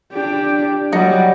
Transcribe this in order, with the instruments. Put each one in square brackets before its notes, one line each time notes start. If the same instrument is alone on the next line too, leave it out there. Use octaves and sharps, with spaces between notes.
[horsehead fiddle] D4 G4
[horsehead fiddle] F#3 G3 [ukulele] D#5 F#5